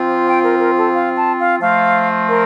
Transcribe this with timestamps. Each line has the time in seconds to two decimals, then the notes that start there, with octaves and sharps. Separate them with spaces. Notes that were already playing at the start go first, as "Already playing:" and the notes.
Already playing: F3 C4 F4
0.27 G5
0.45 A#4
0.60 A#4
0.77 A4
0.94 F5
1.17 A5
1.39 F5
1.61 F3 A3 C4 F4 F5
2.28 A#4